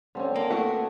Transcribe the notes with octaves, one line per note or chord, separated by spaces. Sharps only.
D3 G3 C4 C#4
A#3
A3 B3 E4 F#4 F#5